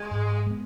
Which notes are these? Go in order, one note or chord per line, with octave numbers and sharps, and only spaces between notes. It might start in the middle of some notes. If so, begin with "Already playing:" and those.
Already playing: G#3
G#2
G#3 B3